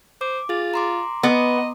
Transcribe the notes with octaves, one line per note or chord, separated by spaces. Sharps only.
C5 D6
F4 G#4 A6
A#5 C6 D6
B3 D#5